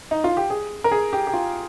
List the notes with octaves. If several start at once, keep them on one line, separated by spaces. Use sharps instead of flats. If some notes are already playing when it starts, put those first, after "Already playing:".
D#4
F4
G4
G#4
A#4
G#4
G4
G4
F4